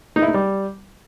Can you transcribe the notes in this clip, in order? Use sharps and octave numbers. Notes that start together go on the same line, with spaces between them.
D#4
E4
D#4
G3